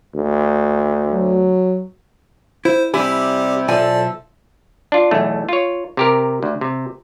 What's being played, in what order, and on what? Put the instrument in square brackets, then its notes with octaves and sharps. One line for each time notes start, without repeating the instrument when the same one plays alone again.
[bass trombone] D2
[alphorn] F#3
[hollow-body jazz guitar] E4 [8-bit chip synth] C5
[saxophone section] C3 G3 [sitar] E4 [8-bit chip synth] G4 [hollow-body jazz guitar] G#5
[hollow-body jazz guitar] B1 G#5 [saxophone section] F3 A4 E5 [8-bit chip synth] D5
[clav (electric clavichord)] D4 F4
B1 E2 A3
F4 C#5
C3 G4 A#4
D2
C3